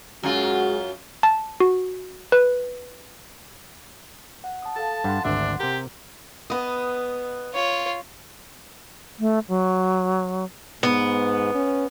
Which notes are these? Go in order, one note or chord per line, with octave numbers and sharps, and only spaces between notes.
F#2 G#3 F4 F#4
A5
F#4
B4
F#5
A5 D#6
A4 F5 A5
G2 F#5 C6
G#1 D2 D4 E5
C3 G4 A#4
B3 D#5
F4 C#5
A3
F#3
G#2 B3
C#4